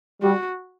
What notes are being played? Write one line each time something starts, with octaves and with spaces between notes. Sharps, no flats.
G3 F#4